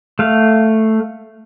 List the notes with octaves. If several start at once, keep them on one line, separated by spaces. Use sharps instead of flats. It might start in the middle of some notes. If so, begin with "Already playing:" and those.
A3 F5